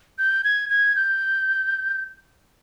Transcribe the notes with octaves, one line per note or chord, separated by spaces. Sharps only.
G6
G#6
G#6
G6